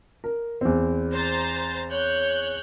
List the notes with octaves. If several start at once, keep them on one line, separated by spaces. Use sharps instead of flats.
A#4
E2 C4
C5 A#5 A6
C#5 F#6 G6